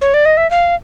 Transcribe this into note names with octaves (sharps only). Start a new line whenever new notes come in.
C#5
D5
D#5
E5
F5